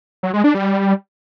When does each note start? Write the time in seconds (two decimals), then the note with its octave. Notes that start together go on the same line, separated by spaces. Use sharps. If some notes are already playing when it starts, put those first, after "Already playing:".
0.23 F#3
0.34 G#3
0.44 D4
0.55 G3